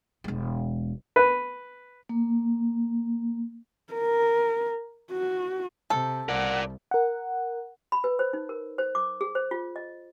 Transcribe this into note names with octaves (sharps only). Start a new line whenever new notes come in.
E1 G#3
B4
A#3
A#4
F#4
C3 A4
C2 A#4 D5 F#5
A#4 F#5
B5
B4
C5
D#4
A#4
C5
D6
G#4
C5
F4
D#5